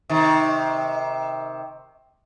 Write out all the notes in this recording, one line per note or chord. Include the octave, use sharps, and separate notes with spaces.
C3 D#3